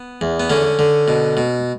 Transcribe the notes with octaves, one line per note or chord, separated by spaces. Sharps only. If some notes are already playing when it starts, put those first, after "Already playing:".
Already playing: B3
E2
B3
D3 C#4
D3
B2
B2